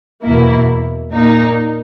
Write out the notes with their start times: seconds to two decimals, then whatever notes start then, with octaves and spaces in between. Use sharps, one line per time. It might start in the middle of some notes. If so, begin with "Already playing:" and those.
0.23 E2 B2 A#3 E4
1.11 A#2 A#3 D#4